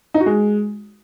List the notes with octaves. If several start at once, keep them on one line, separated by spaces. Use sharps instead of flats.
D#4
F#4
G#3